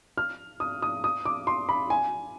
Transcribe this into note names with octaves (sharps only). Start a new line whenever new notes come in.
F6
D#6
D#6
D#6
D6
C6
B5
G#5